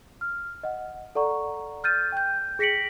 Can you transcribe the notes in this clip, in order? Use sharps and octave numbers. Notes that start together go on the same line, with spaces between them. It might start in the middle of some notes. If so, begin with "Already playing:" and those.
F6
D#5 F#5
A4 D5 F#5 A#5 C#6
F6 G6 A6 D#7
G5 G6
G#4 A#6 B6 C#7 D7 F#7